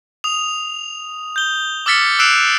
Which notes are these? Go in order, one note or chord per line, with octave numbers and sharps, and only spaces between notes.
D#6 F7
G6 G7
D6 E6 F6 A6 B6 C#7
E6 F#6 C7 D7 E7 F7